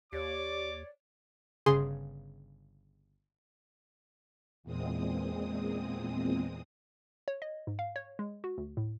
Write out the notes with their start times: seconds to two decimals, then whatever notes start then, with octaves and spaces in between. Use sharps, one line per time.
0.13 D#2 G4 C#5 D5 D6
1.66 G1 C#3 G#4 C6
4.63 E2 A#2 G#3 C4 D#6
7.28 C#5
7.42 D#5
7.67 G#2
7.79 F5
7.96 C#5
8.19 G#3
8.44 F#4
8.58 D2
8.77 A2